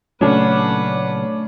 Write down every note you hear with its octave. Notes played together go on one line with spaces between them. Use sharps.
A#2 C#3 F#3 A3 C#4 D4 B4 F#5